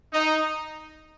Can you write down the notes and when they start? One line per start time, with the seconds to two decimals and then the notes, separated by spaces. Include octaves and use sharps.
0.13 D#4